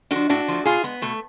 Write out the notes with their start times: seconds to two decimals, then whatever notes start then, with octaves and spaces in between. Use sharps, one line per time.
0.11 F3 A3 D4 F#4
0.29 A2 D4 F#4
0.48 F3 A3
0.65 B2 F4 G#4
0.83 G#3 B3
1.02 B2 A3